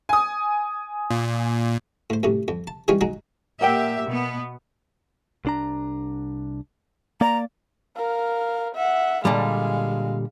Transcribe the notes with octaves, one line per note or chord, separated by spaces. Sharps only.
G#5 D#6
A#2
A2 C5
F#2 A2 C3
F2
A5
E3 G3 G#3 C#4 F4
F#3 G#3 D#4 G#4
A#2 G4 A#4 E5 F#5 G5
B2 B3
C2 D4 A#5
A#3 D5 A#5
A#4 F5
E5 F#5
A#2 D3 G3 G#3 F5